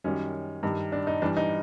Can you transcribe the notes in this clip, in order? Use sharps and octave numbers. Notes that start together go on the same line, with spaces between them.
F#2 D#3 G3 C#4
G2 D#3 G3
D4
D#4
G2 E3 G3 D4
D#4